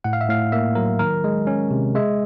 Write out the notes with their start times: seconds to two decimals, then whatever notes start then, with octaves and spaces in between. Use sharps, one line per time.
0.04 A2 F#5
0.13 F5
0.21 E5
0.28 A2 F5
0.52 A#3 E5
0.75 F#3 A#4
0.99 D#3 A#4
1.24 G#3
1.47 C#4
1.71 C3
1.95 G#3 E5